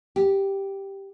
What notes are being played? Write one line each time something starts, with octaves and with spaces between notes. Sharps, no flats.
G4